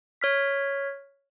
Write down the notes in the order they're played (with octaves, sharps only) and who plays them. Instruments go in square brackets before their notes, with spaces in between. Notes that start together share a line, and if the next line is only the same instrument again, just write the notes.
[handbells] C#5 F6 B6